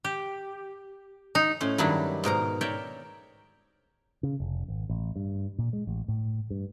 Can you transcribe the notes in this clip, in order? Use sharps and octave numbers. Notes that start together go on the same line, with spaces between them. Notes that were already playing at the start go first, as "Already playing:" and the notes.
G4
D#4
A2 C#4 C5
G2 D#3 F#3 G3 D4 E4
G#2 B2 A#4 A#5
A#4 C#5 D5 E5 G5
C#3
F1
G#1
A1
G2
A#2
G#3
A1
A2
G2